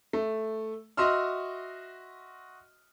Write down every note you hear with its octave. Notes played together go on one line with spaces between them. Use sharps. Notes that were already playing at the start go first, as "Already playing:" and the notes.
A3
F#4 D#5 E5 C6 E6 F6